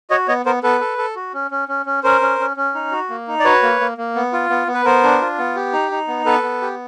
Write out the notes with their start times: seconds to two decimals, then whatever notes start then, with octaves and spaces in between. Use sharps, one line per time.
0.10 F#4 C#5 D#5
0.28 B3 C#5 D#5
0.46 B3 A#4 C5
0.63 B3 A4 B4
0.81 A4
0.98 A4
1.16 F#4
1.34 C#4
1.51 C#4
1.68 C#4
1.86 C#4
2.03 C#4 A#4 C5
2.21 C#4
2.40 C#4
2.57 C#4
2.75 D#4
2.92 F#4
3.10 A#3
3.28 D#4
3.40 D5
3.44 F#4 B4 C#5
3.63 A#3
3.80 A#3
3.98 A#3
4.15 B3
4.33 F4
4.50 B3
4.67 B3
4.74 B4
4.85 B3 A#4 C5
5.04 D4
5.21 F4
5.38 B3
5.56 G4
5.73 D#4
5.91 D#4
6.08 B3
6.25 B3 A4 B4
6.43 B3
6.62 G4